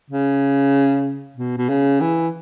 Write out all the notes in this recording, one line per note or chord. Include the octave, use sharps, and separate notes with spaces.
C#3
B2
B2
C#3
E3